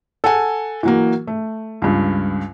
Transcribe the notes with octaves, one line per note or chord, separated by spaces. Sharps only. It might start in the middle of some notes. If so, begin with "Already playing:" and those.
A4 F#5 G#5
E3 F#3 A#3
A3
C#2 G2